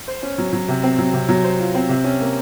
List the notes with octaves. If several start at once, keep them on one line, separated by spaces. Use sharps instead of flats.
C5
C#4
F#3
F#3
C3
C4
F#3
C3
F#3
C5
F4
C4
C3
C#4
A#3